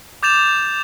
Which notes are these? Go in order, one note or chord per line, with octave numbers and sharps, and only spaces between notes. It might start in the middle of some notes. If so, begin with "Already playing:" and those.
D6 G6 A6 E7 F7